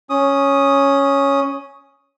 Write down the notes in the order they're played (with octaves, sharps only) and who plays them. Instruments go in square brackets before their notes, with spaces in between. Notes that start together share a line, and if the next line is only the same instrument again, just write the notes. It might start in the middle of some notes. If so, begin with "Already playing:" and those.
[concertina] C#4 D#6